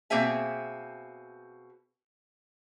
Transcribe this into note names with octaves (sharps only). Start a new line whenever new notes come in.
B2 A#3 C4 G#4 E5 G#5